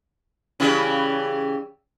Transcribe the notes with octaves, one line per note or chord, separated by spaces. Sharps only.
C#3 E3 G3